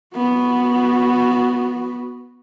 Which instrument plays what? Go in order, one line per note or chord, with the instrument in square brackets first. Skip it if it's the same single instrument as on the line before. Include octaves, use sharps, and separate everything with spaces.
[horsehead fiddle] B3 F#4